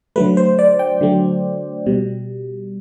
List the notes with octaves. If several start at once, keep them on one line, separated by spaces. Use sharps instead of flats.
D3 F#3 A3 B4
C5
D5
G5
D3 F#3 A3
B2 G3